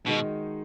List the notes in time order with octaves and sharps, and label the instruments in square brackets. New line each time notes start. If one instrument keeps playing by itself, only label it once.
[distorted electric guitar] B2 [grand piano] D#3 G#3 D#4 F#4